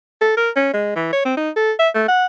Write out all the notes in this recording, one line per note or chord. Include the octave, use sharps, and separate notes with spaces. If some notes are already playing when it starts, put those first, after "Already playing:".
A4
A#4
C#4
G#3
E3
C#5
C4
D#4
A4
E5
A3
F#5